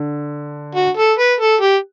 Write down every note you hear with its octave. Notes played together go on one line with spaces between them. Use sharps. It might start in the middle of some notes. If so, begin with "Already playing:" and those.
Already playing: D3
F#4
A4
B4
A4
G4